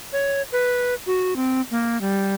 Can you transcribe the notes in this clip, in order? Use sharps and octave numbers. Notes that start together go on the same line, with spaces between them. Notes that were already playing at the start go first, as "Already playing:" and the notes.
C#5
B4
F#4
C4
A#3
G3